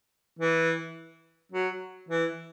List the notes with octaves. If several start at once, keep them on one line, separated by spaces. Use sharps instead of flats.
E3
F#3
E3